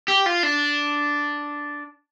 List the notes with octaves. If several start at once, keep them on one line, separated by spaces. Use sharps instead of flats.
G4
F4
D4